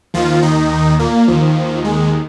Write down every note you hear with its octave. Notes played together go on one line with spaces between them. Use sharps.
D#2 D#3 F3 F4
D#3 D#4
A#2 A#3
D#2 D#3 F3
G#3